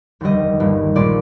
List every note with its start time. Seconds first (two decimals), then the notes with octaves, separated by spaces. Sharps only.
0.21 F1 D#2 D3 G3 D#5
0.60 G1 G2 D#3 A#3
0.95 A#1 A#2 G#3 D#4 D5